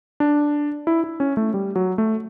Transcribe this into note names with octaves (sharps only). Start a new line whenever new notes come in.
D4
E4
E4
C#4
A3
G3
F#3
A3